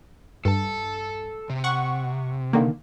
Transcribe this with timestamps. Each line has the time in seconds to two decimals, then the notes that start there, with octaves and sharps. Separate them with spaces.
0.45 G2 A4 A5
1.50 C3
1.64 F#5 C#6
2.53 D3 D#3 A#3